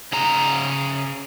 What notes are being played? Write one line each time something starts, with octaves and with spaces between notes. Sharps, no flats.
C#3 G#4 A#5